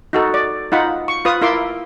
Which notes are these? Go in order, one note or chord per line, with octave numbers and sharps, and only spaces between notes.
D#4 F#4 A4
D5
D#4 F4 F#5 B5
C#6
F4 B4 D#6
E4 F4 A#4 E5 C6 D6